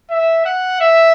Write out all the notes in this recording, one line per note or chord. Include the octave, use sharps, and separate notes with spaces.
E5
F#5
E5